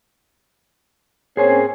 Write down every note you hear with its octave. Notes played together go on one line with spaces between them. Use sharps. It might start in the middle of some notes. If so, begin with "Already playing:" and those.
A#3 C4 C#4 G#4 C5 G#5